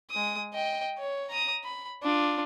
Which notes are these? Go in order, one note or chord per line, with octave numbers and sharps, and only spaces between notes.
G#3 D#6
D#5 G5
C#5
A#5 D#6
B5
D4 F4